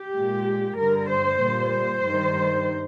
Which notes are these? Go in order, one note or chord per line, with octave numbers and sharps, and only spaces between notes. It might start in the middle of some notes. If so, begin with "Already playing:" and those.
Already playing: G4
A#2 G#3
G2 D3 G3 A#4
C5
A#2 G3
C5
G2 D#3 G3